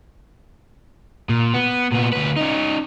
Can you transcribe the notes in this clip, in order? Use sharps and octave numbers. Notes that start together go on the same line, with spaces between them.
A#2
B3
A#2 B3
D2 B4
C#4 D#4